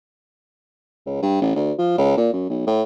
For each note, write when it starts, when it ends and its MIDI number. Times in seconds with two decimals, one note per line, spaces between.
1.06 1.18 37
1.22 1.37 43
1.42 1.52 33
1.56 1.72 38
1.78 1.95 53
1.98 2.15 37
2.17 2.29 46
2.33 2.45 42
2.50 2.63 35
2.67 2.83 45